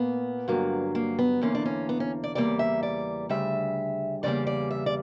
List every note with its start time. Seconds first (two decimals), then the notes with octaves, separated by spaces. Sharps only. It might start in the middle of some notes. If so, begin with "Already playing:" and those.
Already playing: A#2 A#3 B3
0.48 G2 D3 F#3 A#3
0.95 A#3
1.19 B3
1.41 E2 D3 A#3 C#4
1.55 D4
1.65 C#4
1.89 B3
2.00 C#4
2.24 D5
2.35 E2 C#3 G3 A#3 D5
2.59 E5
2.83 D5
3.29 D2 C#3 G3 E5
4.23 E2 C#3 G3 A#3 D5
4.47 D5
4.71 E5
4.86 D5